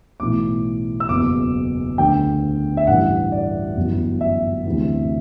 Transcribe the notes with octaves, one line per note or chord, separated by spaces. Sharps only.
B1 A2 E3 D6
E6
F#1 E2 B2 D6
D2 D3 G5
E5
A1 G2 E3 F#5
D5
G1 F#2 E3
E5
D2 C3 E3